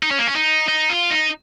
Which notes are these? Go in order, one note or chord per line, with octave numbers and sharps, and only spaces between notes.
D#4
C#4
A#3
C#4
D#4
D#4
F4
D#4